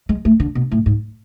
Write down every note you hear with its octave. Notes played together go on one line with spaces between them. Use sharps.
G#3
A3
D3
B2
A2
G#2